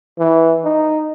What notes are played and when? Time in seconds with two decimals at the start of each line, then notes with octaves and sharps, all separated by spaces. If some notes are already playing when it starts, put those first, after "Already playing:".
0.19 E3
0.64 D#4